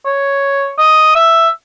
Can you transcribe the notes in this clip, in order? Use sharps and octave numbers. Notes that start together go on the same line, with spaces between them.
C#5
D#5
E5